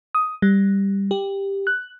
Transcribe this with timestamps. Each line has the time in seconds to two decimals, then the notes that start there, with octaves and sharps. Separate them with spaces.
0.15 D#6
0.42 G3
1.11 G4
1.67 F#6